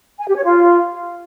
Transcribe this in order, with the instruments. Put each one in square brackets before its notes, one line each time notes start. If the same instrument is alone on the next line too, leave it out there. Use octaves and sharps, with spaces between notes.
[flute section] G#5
G4
C#5
F4